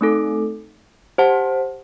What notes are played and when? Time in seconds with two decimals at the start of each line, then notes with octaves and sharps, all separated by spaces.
0.01 A3 C4 D#4 A4
1.18 G4 C5 F#5 A5